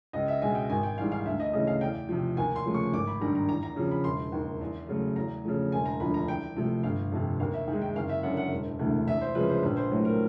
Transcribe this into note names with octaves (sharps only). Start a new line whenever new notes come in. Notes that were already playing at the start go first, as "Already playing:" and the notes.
C#2 D#5
E5
B2 G#3 G#5
G5
G#1 G#5
G5
G#2 E3 G3 F5
F5
D2 E5
D#5
C#3 E3 A3 D#5
F5
E2 G5
C3 F3
D#2 G#5
C6
C#3 F3 A3
C#6
G#1 D6
B5
G2 D#3 G3 A#5
A#5
E2 A#5
A#5
C#3 F3
B5
E1 C6
D#2 D#3
E2
C#3 F#3 A3
E2 A#5
C#3 F3 A3
E1 G#5
A#5
D2 D3 F3 B5
A#5
E2 G5
C3 F3 A3
G1 F5
F2 C3
D#2 F5
E5
D#3 G#3
G5
F#1 F5
E5
F#2 D3 F#5
F#5
E1
D2 C3 E3 A3
E2 E5
C5
C#3 F3 G#3 B4
C5
A#1 B4
C5
A2 F#3 A3
A#4